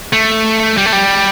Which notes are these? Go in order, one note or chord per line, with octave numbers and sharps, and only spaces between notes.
A3
G3
A3
G3